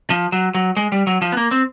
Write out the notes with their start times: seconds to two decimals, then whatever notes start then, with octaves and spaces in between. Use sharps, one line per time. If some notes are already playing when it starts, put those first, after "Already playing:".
0.10 F3
0.32 F#3
0.55 F#3
0.77 G#3
0.92 G3
1.07 F#3
1.22 F3
1.32 B3
1.37 A#3
1.51 C4